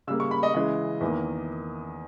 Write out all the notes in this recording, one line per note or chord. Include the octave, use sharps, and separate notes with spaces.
C#3 G3 A#3 E6
C#6
B5
D#5
C#3 E3 G#3 D#5
E2 D#3 A#3